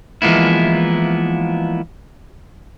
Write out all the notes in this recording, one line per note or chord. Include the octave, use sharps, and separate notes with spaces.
E3 F3 G#3 A#3 B3 E4